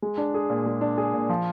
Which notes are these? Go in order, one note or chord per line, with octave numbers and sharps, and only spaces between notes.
G#3
D4
G#4
A#2
G#3
D4
G#4
A#2
F3